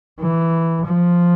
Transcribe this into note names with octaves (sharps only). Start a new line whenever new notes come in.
E3
F3